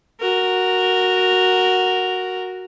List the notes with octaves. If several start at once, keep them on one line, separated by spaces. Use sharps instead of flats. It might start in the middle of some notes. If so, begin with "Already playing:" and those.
F#4 A#4